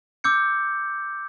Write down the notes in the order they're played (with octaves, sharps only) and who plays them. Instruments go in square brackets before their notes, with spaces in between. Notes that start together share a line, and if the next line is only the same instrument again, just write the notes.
[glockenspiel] D6 E6 G6 C#7